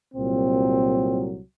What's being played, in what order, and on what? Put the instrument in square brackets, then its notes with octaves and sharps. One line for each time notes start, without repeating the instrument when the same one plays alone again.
[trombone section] C2 A#2 F#3 C4